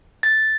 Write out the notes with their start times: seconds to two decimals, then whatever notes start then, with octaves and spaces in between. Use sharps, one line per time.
0.23 A6